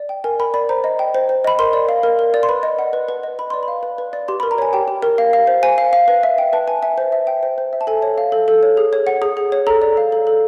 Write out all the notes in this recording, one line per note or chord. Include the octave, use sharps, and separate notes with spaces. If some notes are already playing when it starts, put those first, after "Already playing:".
Already playing: D5
G5
A#4 G#5
A#4 B5
D5 B5
C5 A#5
D#5
G5
C5
C5
D#5 B5
A#4 C6
D5
F5
A#4
A#4
D5
C6
B4 B5
D#5
F#5
B4
B4
D#5
B4 B5
D5 C6
B5
F5
B4
B4
D5
G4 C6
A#4 B5
A#5
C#5 G#5
G4 G5
G4
A#4
F5
F5
C5
C5 G#5
F5
F5
B4
E5
G5
B4 A5
B4 G#5
E5 G#5
C5
E5
G5
C5
C5
E5
A5
A4 G#5
C#5
F5
A4
A4
C#5
G#4
C#5
F#5
G#4
G#4
C#5
A4 A#5
D5
F5
A4
A4